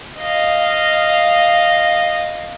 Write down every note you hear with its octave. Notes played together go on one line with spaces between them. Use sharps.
D#5 F5